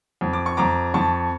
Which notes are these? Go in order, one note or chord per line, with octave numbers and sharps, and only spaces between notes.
F2
D6
C#6
F2 A#5 D6
F2 A5 C#6